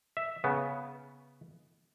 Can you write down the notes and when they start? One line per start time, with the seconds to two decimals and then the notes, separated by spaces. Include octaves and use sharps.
0.17 E5
0.44 C#3 B3